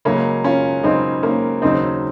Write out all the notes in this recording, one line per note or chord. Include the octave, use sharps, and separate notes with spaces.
C#2 C#3 F#3 A#3 C#4
C#4 F4
C#2 C#3 F#3 C4 D#4
A#3 C#4
D#2 C#3 F#3 C4 D#4